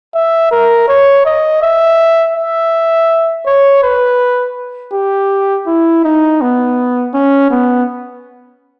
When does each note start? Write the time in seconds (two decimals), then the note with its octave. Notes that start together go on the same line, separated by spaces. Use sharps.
0.15 E5
0.51 A#4
0.88 C#5
1.25 D#5
1.63 E5
2.36 E5
3.46 C#5
3.83 B4
4.93 G4
5.67 E4
6.04 D#4
6.41 B3
7.14 C#4
7.51 B3